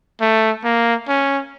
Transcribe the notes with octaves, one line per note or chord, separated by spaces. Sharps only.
A3
A#3
C#4